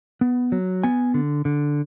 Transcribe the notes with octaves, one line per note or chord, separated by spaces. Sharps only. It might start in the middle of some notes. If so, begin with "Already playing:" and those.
B3
F#3
B3 G#5
D3
D3